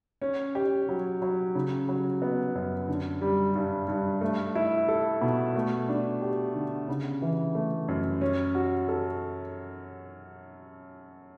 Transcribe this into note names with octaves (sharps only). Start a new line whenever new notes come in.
C#4
G4
F#3
F#3
C#3
F#3
B3
F#2
D3
G3
G2
G2
A3
E4
A4
B2
A3
D4
G4
D3
C#3
E3
A3
F#2
C#4
F#4
A4